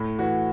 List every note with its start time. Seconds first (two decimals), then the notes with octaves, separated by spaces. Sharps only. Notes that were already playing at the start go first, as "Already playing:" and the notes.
Already playing: A2
0.19 E3 F#4